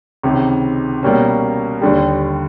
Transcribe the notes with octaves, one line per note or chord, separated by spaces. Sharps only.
C#2 C3 D#3
B2 G3 A#3 C#4
D#2 D3 G3